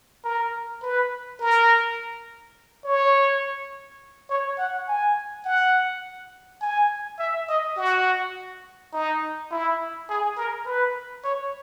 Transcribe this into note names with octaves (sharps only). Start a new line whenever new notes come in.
A#4
B4
A#4
C#5
C#5
F#5
G#5
F#5
G#5
E5
D#5
F#4
D#4
E4
G#4
A#4
B4
C#5